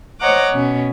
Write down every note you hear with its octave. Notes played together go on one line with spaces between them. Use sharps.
C5 C#5 D#5 F#5 A#5 D6
B2 C#4